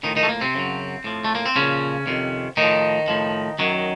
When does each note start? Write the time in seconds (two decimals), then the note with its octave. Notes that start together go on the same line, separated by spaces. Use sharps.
0.03 A2 D#3 F3 D#4
0.16 D#3 D#4
0.23 A3
0.29 A#3
0.41 C3 C4
0.55 F#2 C#3 F#3
1.04 A2 F3
1.24 A3
1.35 A#3
1.46 C4
1.56 A#2 C#3 F3 C#4
2.07 F2 C3 D#3
2.57 A2 D#3 D#4
2.62 F3
3.08 A2 F3
3.59 F#2 D#3 F#3